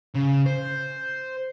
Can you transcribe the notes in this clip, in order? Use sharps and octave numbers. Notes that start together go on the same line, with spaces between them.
C#3
C5